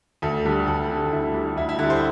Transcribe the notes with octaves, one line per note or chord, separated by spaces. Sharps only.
D2 A4
D3 G3
D2 A4
D3 G3
D2 E4
D3 G3
D2 E4
E4
D3 G3 E4
C5